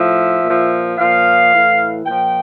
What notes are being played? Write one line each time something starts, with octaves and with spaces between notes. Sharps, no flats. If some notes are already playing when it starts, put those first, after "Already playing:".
Already playing: A2 F3 E5
A#2 F3
A#2 F3 F5
A2 E3
A#2 F3 G5